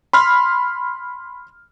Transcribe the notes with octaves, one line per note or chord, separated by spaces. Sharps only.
B5 C6 F6